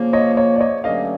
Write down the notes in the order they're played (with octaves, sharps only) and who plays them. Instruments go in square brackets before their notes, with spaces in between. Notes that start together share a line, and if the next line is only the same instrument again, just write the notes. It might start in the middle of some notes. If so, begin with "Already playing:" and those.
Already playing: [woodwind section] C#3 F3 A#3
[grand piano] C#5 D#5
C#5
D5
C#5 D#5
[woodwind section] G2 D3 F#3 A3 C#4 [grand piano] D#5 F5